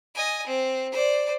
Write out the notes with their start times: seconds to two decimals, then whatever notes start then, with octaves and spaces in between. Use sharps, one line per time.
0.14 D#5 G#5
0.47 C4
0.92 C5 D5